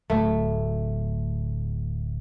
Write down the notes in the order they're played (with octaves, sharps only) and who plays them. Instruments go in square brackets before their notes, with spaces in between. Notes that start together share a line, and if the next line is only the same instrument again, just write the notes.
[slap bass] D1 F#3 [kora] A3